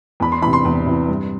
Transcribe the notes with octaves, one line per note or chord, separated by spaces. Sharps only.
E2 B5
C6
C3 E3 B5
C6
E2
C3 E3
G2